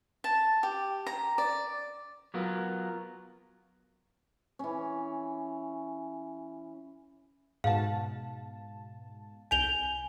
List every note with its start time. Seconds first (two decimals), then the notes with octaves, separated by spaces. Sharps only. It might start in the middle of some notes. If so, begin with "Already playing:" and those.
0.24 A5
0.63 G4
1.07 A#5
1.38 D5
2.34 F#3 B3 F4 A#4
4.59 E3 C#4
7.64 G#2 B2 F5 A5
9.51 C2 G#5 G6 F7 G7